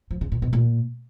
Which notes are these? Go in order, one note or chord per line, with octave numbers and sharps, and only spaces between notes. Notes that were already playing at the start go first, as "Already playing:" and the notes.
F3
C#3
A#2
B2
A#2